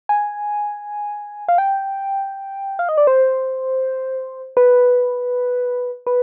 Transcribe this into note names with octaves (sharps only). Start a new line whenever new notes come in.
G#5
F5
G5
F5
D#5
D5
C5
B4
B4